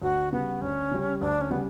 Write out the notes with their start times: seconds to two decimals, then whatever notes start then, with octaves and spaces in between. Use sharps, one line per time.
0.02 D2 F#4
0.33 C#3 G3 B3
0.61 D2 C#4
0.91 C#3 G3
1.21 D2 D4
1.41 C#4
1.50 C#3 G3 B3